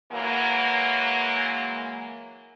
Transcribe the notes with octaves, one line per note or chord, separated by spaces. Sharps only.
E3 F#3 G#3 A#3